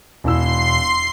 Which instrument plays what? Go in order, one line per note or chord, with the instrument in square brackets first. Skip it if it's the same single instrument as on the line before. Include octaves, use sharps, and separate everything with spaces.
[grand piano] E1 E4 E6 [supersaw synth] C6 C7